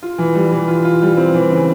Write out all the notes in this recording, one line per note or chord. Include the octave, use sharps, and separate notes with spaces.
F4
E3
G3
E3
F4
F4
G3
C4
E3
C#3